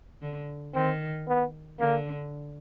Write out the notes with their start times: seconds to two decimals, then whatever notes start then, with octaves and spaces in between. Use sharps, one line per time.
0.22 D3
0.74 D#3 C4
1.28 B3
1.79 D3 A#3